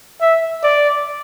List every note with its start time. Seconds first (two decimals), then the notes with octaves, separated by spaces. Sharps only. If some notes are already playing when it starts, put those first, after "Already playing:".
0.22 E5
0.63 D5